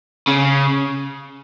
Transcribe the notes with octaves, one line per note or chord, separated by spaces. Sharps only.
C#3